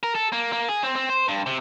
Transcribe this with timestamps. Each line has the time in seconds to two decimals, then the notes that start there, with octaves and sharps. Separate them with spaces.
0.03 A#4
0.15 A4
0.32 A#3
0.52 A#3
0.69 G#4
0.83 C4
0.96 C4
1.09 C5
1.28 G2
1.46 C3